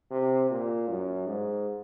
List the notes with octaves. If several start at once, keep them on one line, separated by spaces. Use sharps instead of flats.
C3
A#2
F#2
G#2